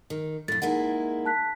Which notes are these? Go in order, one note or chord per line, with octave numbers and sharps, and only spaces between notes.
D#3
F2 A2 A6
G#3 A#3 D#4 E4 F#5
A5 F#6 B6